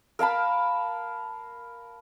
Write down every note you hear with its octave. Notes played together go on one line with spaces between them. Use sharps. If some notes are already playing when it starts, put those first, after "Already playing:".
A#4 F5 A5 B5